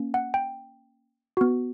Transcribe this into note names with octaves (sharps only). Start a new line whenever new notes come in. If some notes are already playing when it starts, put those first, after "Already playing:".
Already playing: A#3 C#4
F#5
G5
B3 F#4